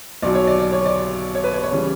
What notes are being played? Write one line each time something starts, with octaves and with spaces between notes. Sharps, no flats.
B1 B2 F#3 D5
C#5
D5
D5
C#5
D5
C#5
B4
C#5
C#5
C#3 E3 G3